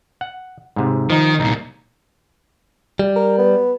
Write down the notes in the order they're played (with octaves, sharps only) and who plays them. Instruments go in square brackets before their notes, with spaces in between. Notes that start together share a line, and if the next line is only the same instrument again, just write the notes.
[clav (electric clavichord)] F#5
G#2 C3
[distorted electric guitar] D#3 [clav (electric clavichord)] F3 D#4
[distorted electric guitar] C2 A#2 [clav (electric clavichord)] D#4
[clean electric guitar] G3
[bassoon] A#4
B3